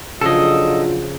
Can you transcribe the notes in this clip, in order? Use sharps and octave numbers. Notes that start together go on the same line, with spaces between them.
C#3 F3 F#3 D4 F4 A4 D#5